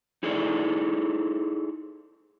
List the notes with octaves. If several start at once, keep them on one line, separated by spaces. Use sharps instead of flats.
D#4 E4 G#4 A4 D5